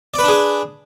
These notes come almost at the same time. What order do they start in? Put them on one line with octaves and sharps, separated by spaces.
D5 B4 D4 G#4